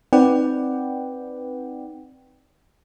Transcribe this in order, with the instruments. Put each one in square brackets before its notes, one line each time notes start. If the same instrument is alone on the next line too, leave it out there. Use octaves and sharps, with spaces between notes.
[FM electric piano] C4 D#4 B4 D5 F#5 G5